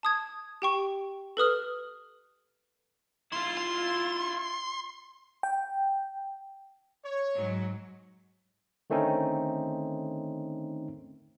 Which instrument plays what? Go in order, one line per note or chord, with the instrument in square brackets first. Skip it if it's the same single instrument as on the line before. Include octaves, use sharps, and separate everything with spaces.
[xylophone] A5 D#6 G#6
G4 G5 C#6
A4 B4 D#6 F6
[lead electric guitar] B1 C6 [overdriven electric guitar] E4 F4
[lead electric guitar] C6
[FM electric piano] G5
[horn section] C#5
[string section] G#2 F#3
[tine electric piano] D3 D#3 A3 C4 C#4 D#4